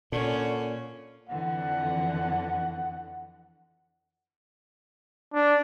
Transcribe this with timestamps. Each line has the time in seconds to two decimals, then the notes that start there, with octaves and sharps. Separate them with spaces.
0.12 A#2 D3 C#4
1.29 F2 D3 E3 F#5
5.33 D4